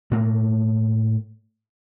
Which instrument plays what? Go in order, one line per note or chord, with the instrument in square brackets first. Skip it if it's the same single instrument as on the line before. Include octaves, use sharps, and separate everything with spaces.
[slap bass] A2 A3 A#3